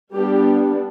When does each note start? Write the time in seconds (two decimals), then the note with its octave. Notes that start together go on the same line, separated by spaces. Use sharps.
0.15 G3 B3 D4 G4